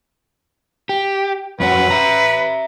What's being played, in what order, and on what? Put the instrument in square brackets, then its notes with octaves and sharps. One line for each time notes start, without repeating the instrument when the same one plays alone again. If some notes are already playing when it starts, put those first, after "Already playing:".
[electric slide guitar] G4
[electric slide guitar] F2 C#4 F#4 [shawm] B4
[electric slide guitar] E5 A#5